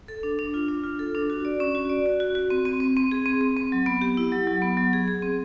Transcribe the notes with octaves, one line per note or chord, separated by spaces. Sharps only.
A4
D4
D4
F4
D4
F4
A4
D4
F#4
D5
C#4
F#4
D5
F#4
F#4
F#4
C4
C4
C4
C4
G#4
C4
C4
C4
F#3
B3
G4
E4
F#3
F#3
B3
F#3
G#4
G#4
C4